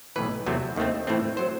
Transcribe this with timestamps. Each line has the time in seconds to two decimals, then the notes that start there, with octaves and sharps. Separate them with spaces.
0.16 B1 A2 E3 B4
0.46 E2 C3 F#3 A3 C4
0.76 D#2 D#3 A3 C4
1.07 A2 E3 A3 C4
1.37 F#3 C5